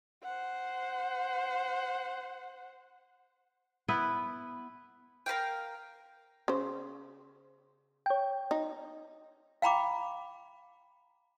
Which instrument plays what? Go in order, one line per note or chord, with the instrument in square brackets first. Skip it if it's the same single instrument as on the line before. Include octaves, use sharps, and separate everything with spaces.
[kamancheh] C5 F#5
[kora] B3 E4 B4
[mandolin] A#4 B4 F5 G5
[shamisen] C#3 C5
[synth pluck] C#5 G5
[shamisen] D#4
[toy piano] F5 G5 A#5 B5 D6